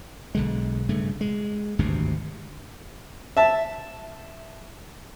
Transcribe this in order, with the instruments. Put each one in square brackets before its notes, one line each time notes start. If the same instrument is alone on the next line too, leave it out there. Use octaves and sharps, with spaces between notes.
[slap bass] B1 D3 G#3
G2 C#3 A3
G#3
G#1 D2 G2 C3
[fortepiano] E5 A5